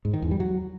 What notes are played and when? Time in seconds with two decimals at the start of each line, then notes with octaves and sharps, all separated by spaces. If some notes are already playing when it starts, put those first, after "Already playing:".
0.05 G#2
0.14 D#3
0.22 E2
0.31 G3
0.40 F#3